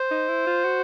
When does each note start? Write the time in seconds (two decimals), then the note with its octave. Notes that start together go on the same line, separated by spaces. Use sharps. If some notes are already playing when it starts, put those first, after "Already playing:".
Already playing: C5
0.11 D#4
0.29 E4
0.47 F4
0.64 F#4